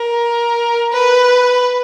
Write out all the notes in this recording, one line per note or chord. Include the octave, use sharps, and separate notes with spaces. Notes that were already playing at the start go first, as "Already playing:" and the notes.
Already playing: A#4
B4